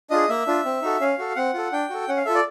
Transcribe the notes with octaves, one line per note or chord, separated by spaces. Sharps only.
D4 F4 G#4 D#5
A#3 E5
D4 F4
C4
D#4 F#4 A4
C#4 F5
F#4 A4
C4 F#5
F4 A4
D4 G5
F#4 A4
C#4 F#5
F5
F4 A4 E5
D5